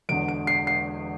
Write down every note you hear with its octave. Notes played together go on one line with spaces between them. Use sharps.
E1 E2 D3 D7
D7
C7
C7